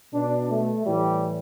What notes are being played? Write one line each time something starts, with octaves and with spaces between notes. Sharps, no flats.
B2 D4
A3
A2 E3 G3